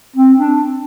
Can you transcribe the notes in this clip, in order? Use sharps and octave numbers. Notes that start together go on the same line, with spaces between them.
C4
D4